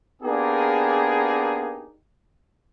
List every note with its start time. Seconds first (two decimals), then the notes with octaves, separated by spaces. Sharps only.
0.23 A#3 B3 D4 D#4 G4 G#4